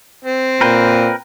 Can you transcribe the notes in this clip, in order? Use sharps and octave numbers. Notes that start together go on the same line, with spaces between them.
C4
A#2 A#4 B4 G5